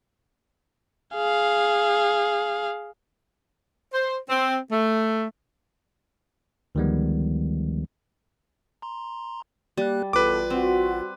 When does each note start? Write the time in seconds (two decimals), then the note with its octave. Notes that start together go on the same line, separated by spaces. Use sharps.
1.15 G#4 F5
3.94 C5
4.29 C4
4.72 A3
6.75 D2 D#3 F3 G3 G#3 B3
8.82 A#5 C6
9.77 G3 A#3 G4 F#6
10.13 A1 E2 B2 F4 A4 B4 D6
10.50 C4 F#4